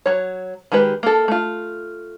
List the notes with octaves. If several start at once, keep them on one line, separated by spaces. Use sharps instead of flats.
F#3 C#5
D#3 G#3 G4 B4
A#3 A4
A3 F4